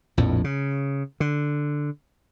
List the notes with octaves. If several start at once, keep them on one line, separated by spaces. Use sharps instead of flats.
A#1 F2 A2
C#3
D3